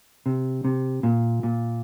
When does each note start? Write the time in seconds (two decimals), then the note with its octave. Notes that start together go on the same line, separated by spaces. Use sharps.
0.26 C3
0.65 C3
1.03 A#2
1.43 A#2